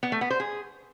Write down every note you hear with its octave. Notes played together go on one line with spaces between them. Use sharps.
B3
A3
B3
C5
G#4